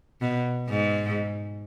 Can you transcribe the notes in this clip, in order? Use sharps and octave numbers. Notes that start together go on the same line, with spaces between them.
B2
G#2